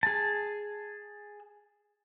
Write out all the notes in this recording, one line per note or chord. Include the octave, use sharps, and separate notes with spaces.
G#4 A5